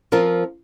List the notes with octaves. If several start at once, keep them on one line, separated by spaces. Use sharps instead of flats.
F3 C4 F4 A#4